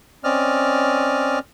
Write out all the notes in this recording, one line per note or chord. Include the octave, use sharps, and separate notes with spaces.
C4 C#4 D5 D#5 F6